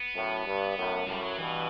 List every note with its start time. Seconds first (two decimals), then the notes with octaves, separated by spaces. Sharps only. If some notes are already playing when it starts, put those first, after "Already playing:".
Already playing: B3
0.14 F#2 A2
0.46 G2
0.76 F#2 A2
1.07 F#2 A2 G3
1.23 F#3
1.38 G2 B2 E3